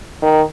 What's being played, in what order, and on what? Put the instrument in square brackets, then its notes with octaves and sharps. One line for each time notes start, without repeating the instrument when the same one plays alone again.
[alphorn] D#3